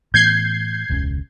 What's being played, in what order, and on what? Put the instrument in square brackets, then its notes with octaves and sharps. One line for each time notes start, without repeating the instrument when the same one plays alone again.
[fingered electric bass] A2 E3 B3 [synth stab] G6 G#6 C7
[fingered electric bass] E1 C#2 C#3